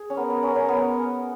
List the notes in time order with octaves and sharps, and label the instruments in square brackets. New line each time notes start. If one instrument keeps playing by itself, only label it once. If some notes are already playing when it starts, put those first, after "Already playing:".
Already playing: [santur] G#4
C#4
[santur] B3 [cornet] A#4
[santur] B3
C#4
C#4
B3